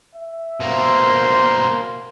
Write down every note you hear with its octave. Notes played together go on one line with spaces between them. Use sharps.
E5
B2 A#3 C5 C6